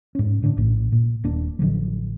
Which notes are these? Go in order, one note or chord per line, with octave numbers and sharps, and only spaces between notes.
G#2 C#4
A2 D3 C#4 D4
A#1 A2
A#2
D#1 A#3 D4
A1 D3 F3 F#3